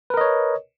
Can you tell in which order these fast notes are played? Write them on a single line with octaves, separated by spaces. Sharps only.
B4 A#4 D#5 C#5